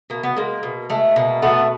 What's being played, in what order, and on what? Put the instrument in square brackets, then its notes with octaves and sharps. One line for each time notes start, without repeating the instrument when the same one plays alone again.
[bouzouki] B2 A#3
B3
G#3 A#3
B2
G#3 A3
B2 A#3
B2 A3 B3